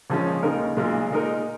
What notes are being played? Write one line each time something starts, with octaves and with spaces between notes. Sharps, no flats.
A#1 A#2 F3 G#3 C#4
D#2 C#3 G#3 D#4 A#4
B1 A#2 G#3
A#2 G#3 D#4 A#4